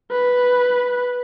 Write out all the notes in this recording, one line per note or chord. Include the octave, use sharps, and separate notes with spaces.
B4